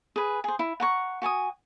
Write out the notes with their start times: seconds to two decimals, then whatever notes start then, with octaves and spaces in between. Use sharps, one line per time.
0.16 G#4 B4
0.44 G#4 C5
0.59 E4
0.80 F#5 A#5 C#6
1.22 F#4 G#5 A5 D#6